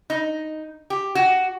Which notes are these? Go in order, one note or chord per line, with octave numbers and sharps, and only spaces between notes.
D#4
G4
F#4